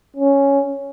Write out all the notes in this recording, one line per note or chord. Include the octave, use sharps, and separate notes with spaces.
C#4